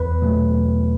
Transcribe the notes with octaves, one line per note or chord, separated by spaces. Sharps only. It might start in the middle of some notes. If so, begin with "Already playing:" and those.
Already playing: E2 B4
B2 F#3 A3
E2